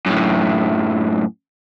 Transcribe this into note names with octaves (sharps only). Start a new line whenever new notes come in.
F#2 A2